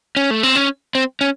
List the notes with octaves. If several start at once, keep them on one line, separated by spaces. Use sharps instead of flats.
C#4
A3
C4
C#4
C4
C#4